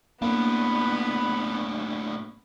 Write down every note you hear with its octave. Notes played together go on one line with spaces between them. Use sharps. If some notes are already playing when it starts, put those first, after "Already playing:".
A2 A#3 B3 D4 B4 B5